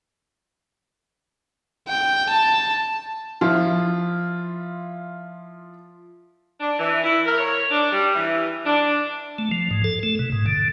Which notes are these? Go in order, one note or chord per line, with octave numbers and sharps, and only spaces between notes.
G5
A5
F3 E4 F4
D4
E3
E4
A#4
C#5
D4
G3
E3
D4
A3
F3
G#2
A4
A3
B2
G#2
D3